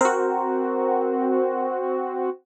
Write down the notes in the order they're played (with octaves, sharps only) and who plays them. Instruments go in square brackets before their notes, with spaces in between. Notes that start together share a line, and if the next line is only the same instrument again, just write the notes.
[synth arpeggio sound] C4 F#4 [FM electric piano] A#4 C5